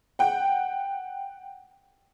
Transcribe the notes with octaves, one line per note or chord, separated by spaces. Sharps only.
F#5 G5